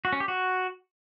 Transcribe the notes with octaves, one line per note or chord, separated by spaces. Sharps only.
F#4
C#4
G4
F#4